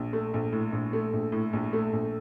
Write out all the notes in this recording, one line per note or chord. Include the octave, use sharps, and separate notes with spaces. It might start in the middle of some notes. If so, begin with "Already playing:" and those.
Already playing: A#1
A3
A#1
A2
A#1
A3
A#1
A2
A#1
A3
A#1